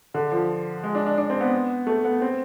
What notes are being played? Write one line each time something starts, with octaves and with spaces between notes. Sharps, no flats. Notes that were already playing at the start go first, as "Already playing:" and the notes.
D3
F3
G#3
D4
D4
D4
C4
B3
A3
B3
C4